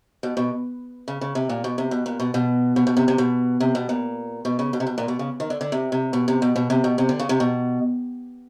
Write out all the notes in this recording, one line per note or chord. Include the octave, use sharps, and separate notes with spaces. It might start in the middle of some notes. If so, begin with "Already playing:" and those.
B2
B2
C#3
C#3
C3
A#2
B2
C3
B2
A#2
B2
B2
B2
B2
C3
C3
B2
C3
B2
A#2
B2
C#3
B2
C3
B2
A#2
B2
C#3
D#3
D3
D3
C3
C3
B2
C3
B2
B2
C3
B2
C3
D3
C#3
C3
B2